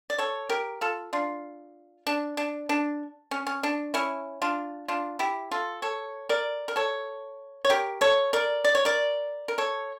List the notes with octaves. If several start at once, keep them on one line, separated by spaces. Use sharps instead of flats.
D5
A4 C#5
G4 A#4
F4 A4
D4 F4
D4
D4
D4
C#4
C#4
D4
C#4 E4
D4 F4
D4 F4
E4 G4
F4 A4
A4 C#5
A#4 D5
A#4
A4 C#5
C#5
G4 A#4
A4 C#5
A#4 D5
D5
C#5
A#4 D5
A#4
A4 C#5